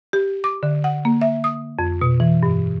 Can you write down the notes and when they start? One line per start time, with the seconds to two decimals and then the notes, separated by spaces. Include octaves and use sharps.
0.13 G4
0.44 D6
0.63 D3
0.84 F#5
1.05 A#3
1.21 E5
1.44 D#6
1.79 F2
2.01 B2
2.20 E3
2.43 G2